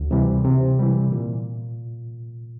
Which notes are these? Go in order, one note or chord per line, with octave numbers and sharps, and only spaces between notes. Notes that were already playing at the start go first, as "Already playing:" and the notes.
Already playing: D2
C3 E3 G3
C3
E3 G3
A#2